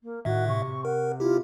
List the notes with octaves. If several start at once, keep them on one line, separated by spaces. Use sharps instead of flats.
A#3
A2 D#3 F#4 E5
C3 C#6
A#4 F#5
E4 F4 G4